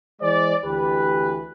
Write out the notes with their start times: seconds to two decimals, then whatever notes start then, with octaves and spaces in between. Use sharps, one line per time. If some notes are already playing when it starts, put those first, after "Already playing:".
0.20 E3 G#3 C5 D5
0.63 D2 E3 G4 B4